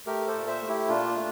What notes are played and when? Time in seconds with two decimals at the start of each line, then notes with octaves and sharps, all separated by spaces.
0.07 A3 G4 A#4
0.27 A4 C5
0.34 A#2
0.47 C5 E5
0.61 A3
0.68 E4 G4
0.88 A#2 D4 F4
1.16 A3